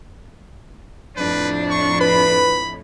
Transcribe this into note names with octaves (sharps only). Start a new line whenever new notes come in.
F2 A2 D4 B4
C#6
B4 B5